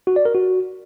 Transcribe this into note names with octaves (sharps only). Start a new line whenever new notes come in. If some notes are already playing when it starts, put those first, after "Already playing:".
F#4
D5
A#4
F#4